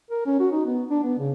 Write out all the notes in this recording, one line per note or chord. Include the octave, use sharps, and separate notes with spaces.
A#4
C#4
F#4
D#4
B3
D4
B3
C#3